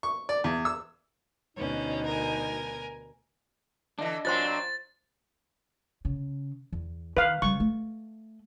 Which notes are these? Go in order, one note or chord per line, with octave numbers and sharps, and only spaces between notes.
C#6
D5
E2
E6
D2 B2 B3 C#4 D#4
A#4 G#5
D3 E3 D4 D#5
A#2 F#3 C4 F4 C5 C6 A6
C#3
E2
D#3 B4 F5
C#3 G3 C#6
A3